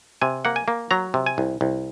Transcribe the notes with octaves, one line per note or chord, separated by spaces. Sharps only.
C3 G#5
A#3 F#5
G#5
A#3
F#3 A#5
C3
G#5
C2
C2